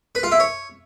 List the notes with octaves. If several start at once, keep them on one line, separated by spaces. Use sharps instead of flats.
B4
F4
E4
C#5